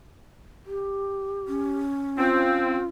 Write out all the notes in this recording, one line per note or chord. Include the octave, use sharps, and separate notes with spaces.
G4
C#4
F3 C4 F4